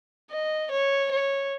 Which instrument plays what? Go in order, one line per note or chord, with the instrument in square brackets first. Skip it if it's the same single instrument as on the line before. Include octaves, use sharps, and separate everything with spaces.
[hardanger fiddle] D#5
C#5
C#5